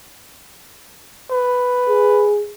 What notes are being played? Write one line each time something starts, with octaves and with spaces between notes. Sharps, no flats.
B4
G#4